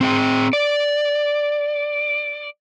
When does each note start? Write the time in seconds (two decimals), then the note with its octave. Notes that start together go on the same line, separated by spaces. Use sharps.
0.01 C4 G#4 G5
0.53 D5